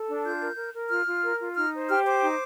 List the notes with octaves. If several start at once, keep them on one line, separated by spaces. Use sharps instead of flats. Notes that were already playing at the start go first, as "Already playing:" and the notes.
Already playing: A4
D4
F4 G6
A#4
A#4
A#4
F4 F6
F4
A#4
F4
D#4 F6
C5
G4 F6
C5 D6
D#4